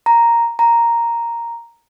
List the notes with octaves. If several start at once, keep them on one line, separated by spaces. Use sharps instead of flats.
A#5
A#5